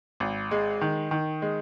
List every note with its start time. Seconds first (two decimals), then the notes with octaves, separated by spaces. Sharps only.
0.20 G#1
0.51 G#3
0.81 D#3
1.11 D#3
1.42 G#3